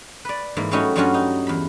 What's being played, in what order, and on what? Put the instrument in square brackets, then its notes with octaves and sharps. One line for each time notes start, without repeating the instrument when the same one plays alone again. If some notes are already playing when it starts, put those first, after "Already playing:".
[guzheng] B4 D5
G#2 E3 A#3
F#3 G3 A3 C#4 D#4 F#4
G2 F#3 G3 C#4 F4 F#4
D#4
E2 B5